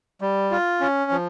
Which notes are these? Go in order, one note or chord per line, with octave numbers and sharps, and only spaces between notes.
G3
F4
C#4
F3